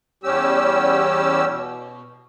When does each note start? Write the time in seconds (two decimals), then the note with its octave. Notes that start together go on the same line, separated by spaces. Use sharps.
0.24 E2 G3 C#4 G4 E6
1.49 B2